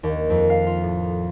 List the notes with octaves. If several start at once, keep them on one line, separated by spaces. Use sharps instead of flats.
D#2
F2
F5
F4
A2